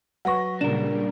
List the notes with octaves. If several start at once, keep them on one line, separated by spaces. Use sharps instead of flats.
F#3 B4 F#5 C#6 A#6
A#2 C#3 G3 D4 A#4 E7